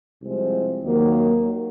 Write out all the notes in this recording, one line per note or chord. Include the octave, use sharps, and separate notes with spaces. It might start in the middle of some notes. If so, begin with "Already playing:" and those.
C2 C3 F3 G#3 C4
D#2 D#3 F#3 A#3